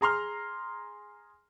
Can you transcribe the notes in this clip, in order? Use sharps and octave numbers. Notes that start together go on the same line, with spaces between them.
G#4 A#5 C6 F6